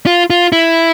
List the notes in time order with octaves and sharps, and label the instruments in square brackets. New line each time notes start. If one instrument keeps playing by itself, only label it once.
[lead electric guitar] F4
F4
E4